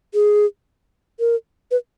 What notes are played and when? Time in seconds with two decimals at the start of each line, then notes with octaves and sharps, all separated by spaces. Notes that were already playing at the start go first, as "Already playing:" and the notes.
0.14 G#4
1.20 A#4
1.71 B4